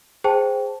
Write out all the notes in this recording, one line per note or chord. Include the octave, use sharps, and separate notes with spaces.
G#4 C5 G5 A5